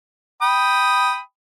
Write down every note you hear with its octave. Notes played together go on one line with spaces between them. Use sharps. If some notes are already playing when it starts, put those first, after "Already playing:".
G5 B5 D#6